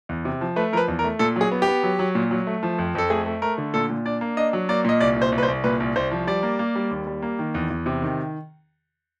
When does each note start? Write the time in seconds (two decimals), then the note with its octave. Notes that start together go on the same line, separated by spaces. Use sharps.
0.09 E2
0.25 C3
0.41 F3
0.56 A3 B4
0.73 F3 A#4
0.77 B4
0.88 E2
0.99 A#4
1.04 A3
1.19 A#2 A4
1.36 F#3 G#4
1.52 B3
1.62 G4
1.67 B3
1.83 F#3
1.99 F#3
2.15 A#2
2.31 F#3
2.47 A3
2.63 F3
2.78 F2
2.95 F2 A4
3.10 A3 G#4
3.26 A3
3.42 A3 A#4
3.58 D3
3.74 A#2 A4
3.89 A#2
4.05 D4 D5
4.21 A#3
4.37 D4 D#5
4.53 F#3
4.69 A#3 D5
4.85 A#2 D#5
5.00 C2 D5
5.16 A#2
5.22 C5
5.32 C2
5.38 B4
5.43 C5
5.48 C2
5.64 A#2 B4
5.80 C2
5.96 C2 C5
6.11 F3
6.27 G3 D5
6.43 A#3
6.59 A#3
6.75 G3
6.91 D#2
7.07 G3
7.22 A#3
7.39 D#3
7.54 E2
7.70 E2
7.86 C3
8.02 D#3